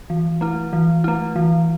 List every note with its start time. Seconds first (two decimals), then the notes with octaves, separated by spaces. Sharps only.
0.10 E3
0.41 A3 E4
0.73 E3
1.04 A3 E4
1.36 E3